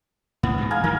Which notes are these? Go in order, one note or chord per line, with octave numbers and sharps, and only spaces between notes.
C#2 A2 B3
G#2 B2
F5 G#5 A#5
D#3 E3 G3 A#4